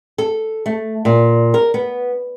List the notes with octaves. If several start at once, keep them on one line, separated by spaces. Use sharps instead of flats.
A4
A3
A#2
A#4
B3